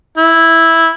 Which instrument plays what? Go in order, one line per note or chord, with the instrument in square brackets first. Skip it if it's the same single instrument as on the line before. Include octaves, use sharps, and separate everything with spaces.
[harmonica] E4